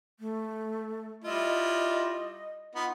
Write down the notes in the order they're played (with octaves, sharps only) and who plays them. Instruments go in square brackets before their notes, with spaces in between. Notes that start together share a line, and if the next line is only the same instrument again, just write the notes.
[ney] A3
[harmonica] G3 E4 F4 [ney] D#5
[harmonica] B3 D#4 F4